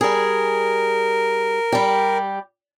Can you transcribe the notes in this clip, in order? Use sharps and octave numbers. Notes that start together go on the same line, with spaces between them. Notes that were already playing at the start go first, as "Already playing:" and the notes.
G3 G#4 A#4
G3 G4